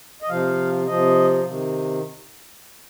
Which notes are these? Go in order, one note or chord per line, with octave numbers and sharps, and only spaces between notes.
D#5
C3 F3 F5
C3 F3 D#5
C3 D#3